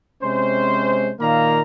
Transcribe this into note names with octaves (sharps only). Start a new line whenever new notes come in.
C3 G#3 C#4 C5
A#2 D#3 A#3 F5 A#5